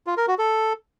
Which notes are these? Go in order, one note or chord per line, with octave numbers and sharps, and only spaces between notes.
F4
A#4
F#4
A4